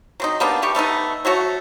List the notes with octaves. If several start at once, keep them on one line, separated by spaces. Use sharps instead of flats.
F#3 C4 D#4
G3 A#3 B3 D4
A3 G4 C#6
G3 A3 B3 D#4
F#3 A3 F#4 C#5